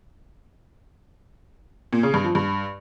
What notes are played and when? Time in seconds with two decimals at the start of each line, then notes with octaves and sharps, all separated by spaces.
1.93 A#2
2.03 C#3
2.14 G2
2.24 F3
2.35 G2